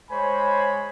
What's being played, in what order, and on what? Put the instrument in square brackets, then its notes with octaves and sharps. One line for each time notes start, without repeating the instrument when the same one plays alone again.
[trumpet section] G#3 C5 C#5 G#5 B5